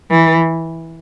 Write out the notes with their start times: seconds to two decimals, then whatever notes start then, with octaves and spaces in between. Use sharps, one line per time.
0.11 E3